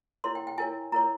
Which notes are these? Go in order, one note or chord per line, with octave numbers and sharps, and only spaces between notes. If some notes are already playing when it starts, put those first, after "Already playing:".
E4 A#4 C#5 C6
G5
G5
E4 A#4 C#5 G#5
E4 A#4 C#5 A#5